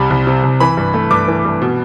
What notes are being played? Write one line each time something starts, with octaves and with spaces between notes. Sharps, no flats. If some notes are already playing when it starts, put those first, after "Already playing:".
Already playing: C2 C3 G3 B5
C2
C3
C2
E3 B5
G2
A3
G2 D6
E3
G2
B2